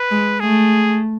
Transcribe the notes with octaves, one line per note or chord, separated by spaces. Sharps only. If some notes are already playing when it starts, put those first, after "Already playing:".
Already playing: B4
G#3
A3 G#4